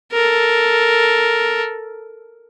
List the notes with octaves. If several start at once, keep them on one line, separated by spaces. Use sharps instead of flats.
A4 A#4